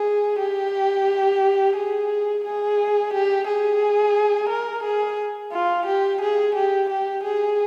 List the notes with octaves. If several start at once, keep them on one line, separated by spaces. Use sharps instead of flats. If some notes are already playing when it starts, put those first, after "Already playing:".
Already playing: G#4
G4
G#4
G#4
G4
G#4
A#4
G#4
F4
G4
G#4
G4
G4
G#4